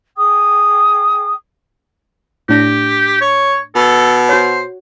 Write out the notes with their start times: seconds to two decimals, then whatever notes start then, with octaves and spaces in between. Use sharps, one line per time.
0.16 G#4 G5 D#6
2.49 A2 D4 G4 A#6
3.21 C#5
3.76 B2 A4
4.29 F#4 C5 C#5